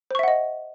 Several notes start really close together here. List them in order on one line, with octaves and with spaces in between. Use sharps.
C5 C#6 E5 F#5 D#5